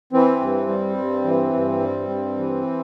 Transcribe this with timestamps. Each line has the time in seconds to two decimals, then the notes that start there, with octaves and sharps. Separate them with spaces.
0.13 E3 C4
0.40 G2
0.68 G3
0.97 G2
1.24 E3
1.53 G2
1.80 G3
2.09 G2
2.38 E3